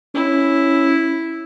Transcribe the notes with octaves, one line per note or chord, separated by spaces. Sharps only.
C#4 E4